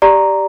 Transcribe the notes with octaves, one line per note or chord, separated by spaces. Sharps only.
G4 D5 A#5